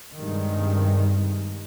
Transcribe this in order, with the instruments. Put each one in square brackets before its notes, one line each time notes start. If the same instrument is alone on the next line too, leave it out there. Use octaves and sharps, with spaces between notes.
[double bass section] G2 C3 D#3 G3 G#3